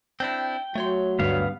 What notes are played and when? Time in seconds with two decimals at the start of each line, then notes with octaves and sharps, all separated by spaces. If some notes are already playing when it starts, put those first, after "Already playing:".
0.20 C4 D4 E4 G5
0.76 F#3 A3 C#5 C6
1.19 D2 G2 B3 F5